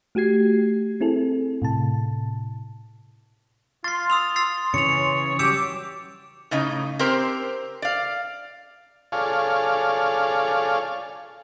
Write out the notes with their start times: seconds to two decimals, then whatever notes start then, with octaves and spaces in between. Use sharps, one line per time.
0.15 A3 F#4 G4 G#6 C7
1.01 C4 E4 G#4 A4
1.62 A2 C3 A5
3.84 F4 C6 A6 C7
4.10 D#6 E6 F7
4.36 E6 A6 C7
4.74 C#3 E3 C#4 C#5 C#7 F7
5.39 F#3 G3 F#4 G4 D6 E6 C#7 E7
6.51 A2 C#3 D#4
6.99 C4 G4 A#4 C5
7.82 D5 F5
9.12 F4 G#4 A4 C#5 D5 F5